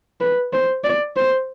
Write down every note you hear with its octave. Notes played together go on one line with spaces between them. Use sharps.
B4
C5
D5
C5